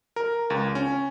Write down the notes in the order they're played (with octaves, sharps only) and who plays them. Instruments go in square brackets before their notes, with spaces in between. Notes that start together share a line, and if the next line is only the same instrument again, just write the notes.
[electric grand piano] A#4
C#2
C#4